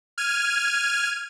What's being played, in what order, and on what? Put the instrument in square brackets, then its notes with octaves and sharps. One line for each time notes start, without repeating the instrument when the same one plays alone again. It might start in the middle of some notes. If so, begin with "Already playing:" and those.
[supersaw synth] F6 G#6 D#7